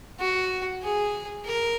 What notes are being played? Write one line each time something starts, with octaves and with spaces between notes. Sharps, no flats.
F#4
G#4
A#4